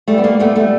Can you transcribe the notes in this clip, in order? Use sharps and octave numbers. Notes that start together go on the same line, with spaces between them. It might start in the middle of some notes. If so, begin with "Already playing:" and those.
G3 A3
B3
G3 A#3
A#2 A3 B3
G3 A3 B3